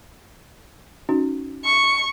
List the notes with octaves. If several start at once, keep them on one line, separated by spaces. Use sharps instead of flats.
C#4 D#4 F#4
C#6